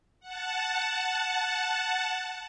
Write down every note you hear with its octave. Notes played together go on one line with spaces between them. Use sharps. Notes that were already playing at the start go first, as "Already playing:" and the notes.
F#5 A5